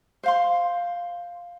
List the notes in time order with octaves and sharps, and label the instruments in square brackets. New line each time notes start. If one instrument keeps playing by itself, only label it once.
[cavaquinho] C5 F5 C6